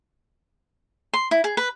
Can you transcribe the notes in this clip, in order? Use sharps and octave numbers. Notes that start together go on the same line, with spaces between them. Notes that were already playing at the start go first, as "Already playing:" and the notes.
C6
E4
G#4
B4